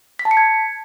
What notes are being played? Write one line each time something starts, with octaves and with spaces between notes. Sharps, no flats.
B6
A5
C#7
G#6